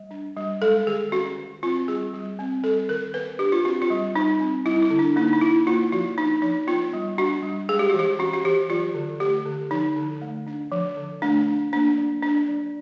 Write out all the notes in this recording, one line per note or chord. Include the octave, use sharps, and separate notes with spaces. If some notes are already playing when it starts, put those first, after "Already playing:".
Already playing: G3
D4
G3
G#3 A4
D#3 G#4
C#4 F#4
D#3
C4 F4
G3 G#4
G3
C4
G3 A4
D#3 A#4
B3 B4
D4 G4
F4
C4 F#4
F4
G3
G3 D#4
C4
G3 E4
E4
D3
D4
A#3 D#4
D#4
C#4 E4
A#3 F4
F3 F#4
D4 D#4
F3 D#4
B3 F4
G3
D4 F#4
G3
G#3 G#4
G4
E3 F#4
G4
C#4 F#4
F#4
E3 G4
F#3 F4
D3
A3 G4
D3
F3 D#4
D3
A3
D4
F3
D3
A3 D4
D4
A#3 D4
F#3
D4
F#3